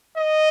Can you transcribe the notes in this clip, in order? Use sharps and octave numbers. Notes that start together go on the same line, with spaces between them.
D#5